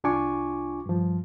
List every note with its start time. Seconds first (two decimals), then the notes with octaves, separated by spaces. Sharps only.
0.04 C2 D4 F4 G#5 C#6 D6
0.86 G2 F3